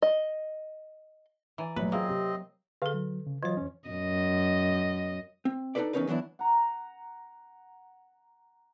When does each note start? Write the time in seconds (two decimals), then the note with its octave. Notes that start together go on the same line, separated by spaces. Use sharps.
0.02 D#5
1.58 E3 D5 G#5 A#5
1.76 A#1 A2 F#3 B4
1.92 A#3 C4 F4 G#4 D#5 E5
2.09 C3
2.82 D3 G#4 A4 B4 F5
2.94 F#3
3.27 C#3
3.43 E3 F#3 F4 C#5 D#5
3.57 F2 C#4
3.89 F#2 D#5
5.45 C4
5.75 D4 D#4 F#4 A4 B4 D5
5.93 E2 A#3 C#4 D#4 A#4 B4
6.07 E3 F#3 B3 D4 E4
6.39 F#5 A#5